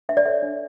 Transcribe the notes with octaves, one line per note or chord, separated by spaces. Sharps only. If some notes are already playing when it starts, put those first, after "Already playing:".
D4 E5
D5
A4 C#5 E5
D4